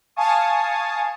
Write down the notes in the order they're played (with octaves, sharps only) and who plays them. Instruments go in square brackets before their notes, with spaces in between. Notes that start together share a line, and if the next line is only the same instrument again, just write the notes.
[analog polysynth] F5 G#5 A5 C#6 D#6